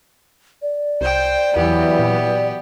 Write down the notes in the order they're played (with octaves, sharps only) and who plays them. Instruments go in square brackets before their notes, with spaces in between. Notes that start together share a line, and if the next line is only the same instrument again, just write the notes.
[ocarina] D5
[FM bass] C2 [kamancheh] C5 G5
[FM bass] E2 [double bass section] E3 F#3 [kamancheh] B3 G4
[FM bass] A#2